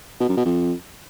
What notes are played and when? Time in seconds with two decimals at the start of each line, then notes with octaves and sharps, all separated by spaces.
0.20 B2
0.29 F#2
0.37 B2
0.46 F2